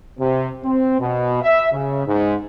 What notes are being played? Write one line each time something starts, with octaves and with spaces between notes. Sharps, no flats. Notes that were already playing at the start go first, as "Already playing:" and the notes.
C3
C4
B2
E5
C#3
G#2